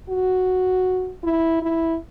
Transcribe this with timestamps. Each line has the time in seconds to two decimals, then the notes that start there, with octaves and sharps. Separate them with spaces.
0.09 F#4
1.24 E4
1.62 E4